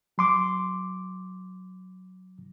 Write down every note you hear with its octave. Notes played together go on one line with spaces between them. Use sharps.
F#3 C6 D6